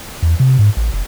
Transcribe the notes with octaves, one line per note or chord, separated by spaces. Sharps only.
E2
C3
G#2
A1
F1